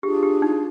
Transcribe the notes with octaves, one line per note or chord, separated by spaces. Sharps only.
D4 F4 G4 G#4
G4
D#4